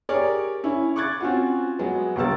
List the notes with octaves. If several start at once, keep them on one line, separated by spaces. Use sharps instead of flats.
G4 G#4 A#4 C#5 D5
C#4 E4
C#6 D6 F#6 G#6 A6
C4 C#4 F4 F#4
F#3 G#3 B3
G1 C#2 A#3 E6 A6